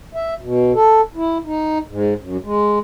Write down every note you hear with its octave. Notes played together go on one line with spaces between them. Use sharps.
E5
B2
A4
E4
D#4
G#2
F#2
G#3